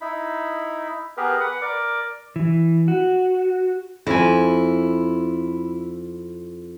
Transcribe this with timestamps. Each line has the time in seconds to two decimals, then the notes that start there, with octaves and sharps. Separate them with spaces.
0.01 D#4 E4 B5
1.17 B3 G4 G#4 A#4 B4
1.40 B4 F#5
1.62 A#4 D5 D6
2.36 E3
2.88 F#4
4.07 F2 E4 G#5